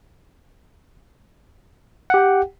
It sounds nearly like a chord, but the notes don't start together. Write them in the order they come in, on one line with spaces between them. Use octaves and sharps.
F#5 G4 G5